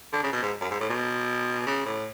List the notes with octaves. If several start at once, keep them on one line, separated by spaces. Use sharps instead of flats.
D3
C#3
B2
G#2
F#2
G#2
A2
B2
C#3
A2